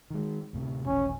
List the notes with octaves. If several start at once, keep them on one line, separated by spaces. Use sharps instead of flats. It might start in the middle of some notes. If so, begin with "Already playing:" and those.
D#3 G#3
D2 A2 C3
D#1 A1 C#4